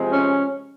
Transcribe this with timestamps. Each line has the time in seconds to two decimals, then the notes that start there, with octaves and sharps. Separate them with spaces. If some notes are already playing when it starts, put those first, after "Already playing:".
Already playing: C3 F3 G#3 C4
0.11 C#4